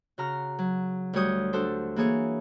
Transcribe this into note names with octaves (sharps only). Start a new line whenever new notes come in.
C#3 F#4 A#5 F6
F#3
D2 G3 F#4 C#5 D#6 G6
D4 F#4 A4 C5
E3 A#3 G#4 C#5